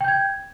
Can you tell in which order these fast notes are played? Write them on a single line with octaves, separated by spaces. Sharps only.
G5 G6 G#6